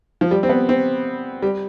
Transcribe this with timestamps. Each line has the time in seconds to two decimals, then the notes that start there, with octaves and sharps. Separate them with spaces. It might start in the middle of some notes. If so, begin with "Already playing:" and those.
0.21 F3
0.31 G3
0.43 C4
0.49 B3
0.69 C4
1.42 G3